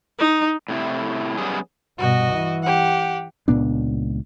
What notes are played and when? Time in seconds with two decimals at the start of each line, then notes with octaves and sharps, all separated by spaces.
0.19 D#4
0.68 A2 C3 E4
1.37 F#2 G3 B3 G#4
1.98 G2 B2 F#4 D#5
2.32 E3
2.63 G4 F#5
3.48 C#2 A#2 B3 D4